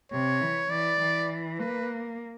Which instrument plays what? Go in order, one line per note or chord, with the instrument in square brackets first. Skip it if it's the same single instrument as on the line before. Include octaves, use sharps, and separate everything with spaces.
[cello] C3 [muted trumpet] C#5
[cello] E3
[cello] E3 [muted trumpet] D5
[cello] E3
[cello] A#3 [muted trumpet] B4